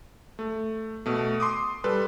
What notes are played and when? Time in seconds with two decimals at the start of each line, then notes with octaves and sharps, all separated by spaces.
0.39 A3
1.06 B2 A3
1.40 C6 D6 D#6
1.84 G3 A4 B4